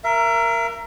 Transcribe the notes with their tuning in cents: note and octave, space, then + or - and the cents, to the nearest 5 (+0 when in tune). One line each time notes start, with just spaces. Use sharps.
A#4 +0 E5 +35